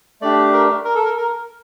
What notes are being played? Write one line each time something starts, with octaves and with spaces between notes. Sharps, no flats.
A3 D4 G4 D5
A#4
A#4
A4
A#4
A#4